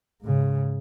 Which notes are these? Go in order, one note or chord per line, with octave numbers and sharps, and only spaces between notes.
G#2 C#3